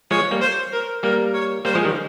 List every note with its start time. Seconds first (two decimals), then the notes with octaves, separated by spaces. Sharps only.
0.10 F3 G#3 C#5
0.31 G3 A#3
0.41 C5
0.72 A#4
1.03 G3 A#3 A#4
1.34 C#5
1.65 G3 A#3 C5
1.75 F3 G#3
1.85 D#3 G3